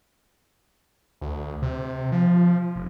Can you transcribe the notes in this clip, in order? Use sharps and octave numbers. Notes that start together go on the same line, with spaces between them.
D2
C3
F3
F1